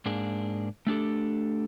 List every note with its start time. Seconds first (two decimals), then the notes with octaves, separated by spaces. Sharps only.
0.06 G#2 A#3 D4 G#4
0.87 A3 D4 G4 A4